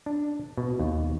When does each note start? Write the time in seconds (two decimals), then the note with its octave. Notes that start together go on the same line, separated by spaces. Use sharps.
0.06 D4
0.57 B2
0.79 D#2